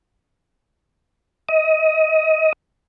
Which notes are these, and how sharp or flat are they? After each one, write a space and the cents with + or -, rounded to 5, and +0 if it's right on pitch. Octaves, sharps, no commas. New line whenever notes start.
D#5 +25